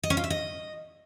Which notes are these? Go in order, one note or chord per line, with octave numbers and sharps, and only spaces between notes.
D#5
C#4
F4
E5
D#5